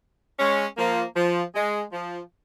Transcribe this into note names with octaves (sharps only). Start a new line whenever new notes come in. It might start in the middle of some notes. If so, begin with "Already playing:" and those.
G#3 C#4
F3 A#3
F3
G#3
F3